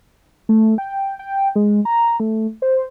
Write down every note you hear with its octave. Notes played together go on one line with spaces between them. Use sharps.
A3
G5
G5
G#3
A#5
A3
C5